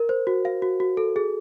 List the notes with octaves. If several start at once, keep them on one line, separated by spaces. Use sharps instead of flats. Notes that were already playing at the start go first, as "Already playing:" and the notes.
Already playing: A#4
C5
F#4
F5
F#4
F#4
A4
G#4